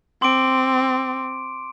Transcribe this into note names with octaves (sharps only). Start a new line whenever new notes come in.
C4 C6 D6 D7